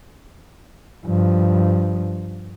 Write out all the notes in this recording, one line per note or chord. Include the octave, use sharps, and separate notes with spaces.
G2 F3